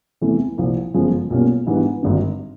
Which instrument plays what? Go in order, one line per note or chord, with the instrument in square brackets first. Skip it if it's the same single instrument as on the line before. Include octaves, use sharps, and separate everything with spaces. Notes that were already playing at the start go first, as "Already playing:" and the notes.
[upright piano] E2 C3 E3 A3
C2 A#2 F3
G1 F#2 C#3 F3 G#3
B1 A#2 G3 A#3 C#4
G#2 E3 G3 B3 D4
G#1 G2 D3